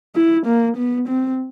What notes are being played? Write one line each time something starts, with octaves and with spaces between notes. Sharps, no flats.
E4
A#3
B3
C4